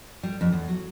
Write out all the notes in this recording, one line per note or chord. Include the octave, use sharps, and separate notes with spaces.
G3
F2
E2
F#3